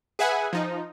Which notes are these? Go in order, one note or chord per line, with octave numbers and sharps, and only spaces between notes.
G#4 B4 E5 F#5 G#5
F3 D#4